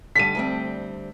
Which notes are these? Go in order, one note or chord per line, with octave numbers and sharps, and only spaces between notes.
D3 G3 B6 D#7
D2 G3 C4